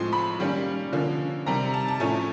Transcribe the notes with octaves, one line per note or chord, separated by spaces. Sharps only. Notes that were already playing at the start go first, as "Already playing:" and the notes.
Already playing: A2 F3 G#3 C4 C6
B5
D#3 G3 A#3 C#4
D3 F3 A#3 C#4
C3 D#3 G3 C4 A#5
A5
A5
A2 F3 A3 C#4 G#5